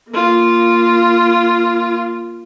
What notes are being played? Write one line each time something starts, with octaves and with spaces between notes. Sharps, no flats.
A#3 F4